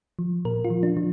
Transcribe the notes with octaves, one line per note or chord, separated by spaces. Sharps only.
F3
A#2 A#4
F4
F3
D4
F3